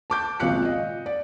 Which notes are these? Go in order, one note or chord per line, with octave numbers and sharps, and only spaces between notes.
A5 D6 G6
G#1 C#2 A#2 F5 F#6 C#7
D#5
D5